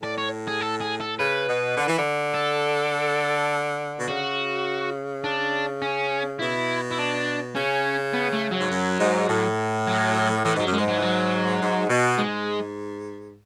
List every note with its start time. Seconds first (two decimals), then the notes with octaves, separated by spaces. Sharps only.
0.03 A2 D5
0.18 C#5
0.47 G#4
0.61 A4
0.81 G#4
1.00 A4
1.19 C#3 B4
1.48 B2
1.77 D3
1.87 E3
1.98 D3
2.34 A4
4.00 B2
4.08 C#3 F#4
5.24 D4
5.82 C#4
6.40 B2 E4
6.91 E4
6.98 D4
7.55 C#3 C#4
8.14 B3
8.33 A3
8.52 F#3
8.60 G#2
8.71 F#2
9.00 G#2
9.28 A2
9.87 F#3
10.44 A2 E3
10.56 G#2 F#3
10.66 F#2
10.73 G#3
10.78 G#2
10.88 F#3
10.98 E3
11.02 F#3
11.61 G#2
11.90 B2
12.18 G#2 G#3